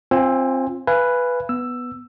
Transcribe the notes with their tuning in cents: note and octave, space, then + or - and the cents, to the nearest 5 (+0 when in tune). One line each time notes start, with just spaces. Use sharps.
C4 +15 F4 +0 G#5 -15
B4 +0 F5 -35 G#5 +0
B3 +0 E6 +10